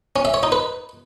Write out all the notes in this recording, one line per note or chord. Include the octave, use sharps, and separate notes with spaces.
C#4
E5
C#5
D#4
B4